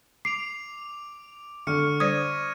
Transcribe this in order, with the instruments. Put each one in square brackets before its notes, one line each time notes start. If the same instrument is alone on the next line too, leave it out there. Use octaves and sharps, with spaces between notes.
[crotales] D6 D7 F7 [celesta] C7
[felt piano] D3 [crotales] C#6 F6 C#7
[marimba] G3 C5 D5 [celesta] D#6 [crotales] G#6 A#6 D#7